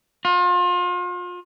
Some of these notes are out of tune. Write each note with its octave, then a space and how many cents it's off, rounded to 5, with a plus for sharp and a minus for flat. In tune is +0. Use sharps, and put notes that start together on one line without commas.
F4 +35